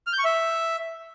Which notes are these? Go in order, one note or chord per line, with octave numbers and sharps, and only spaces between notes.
F6
G6
C#6
E5